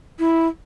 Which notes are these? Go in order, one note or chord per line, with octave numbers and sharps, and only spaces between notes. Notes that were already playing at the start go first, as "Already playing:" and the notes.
E4